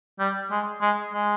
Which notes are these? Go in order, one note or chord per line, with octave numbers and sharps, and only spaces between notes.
G3
G#3
G#3
G#3